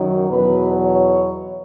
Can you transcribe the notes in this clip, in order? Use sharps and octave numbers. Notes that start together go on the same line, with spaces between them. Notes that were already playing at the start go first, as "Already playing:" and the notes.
Already playing: F#2 D#3 F#3
E2 B2 F#3 B4
C#5